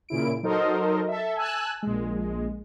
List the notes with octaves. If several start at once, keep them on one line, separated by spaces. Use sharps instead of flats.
A#2 C#3 E4 D7
F#3 D#4 A4 A#4 C5 D#5
A4 E5
G#5 A5 E6 F#6
A#1 G#3